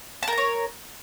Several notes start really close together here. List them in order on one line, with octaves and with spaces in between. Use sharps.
A5 A#4 A#5 C#5